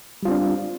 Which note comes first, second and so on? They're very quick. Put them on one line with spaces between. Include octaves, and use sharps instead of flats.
G3 F4 C4 D4